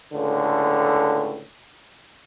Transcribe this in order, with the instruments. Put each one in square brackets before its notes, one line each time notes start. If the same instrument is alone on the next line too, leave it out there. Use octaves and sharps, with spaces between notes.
[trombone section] C#2 A2 D3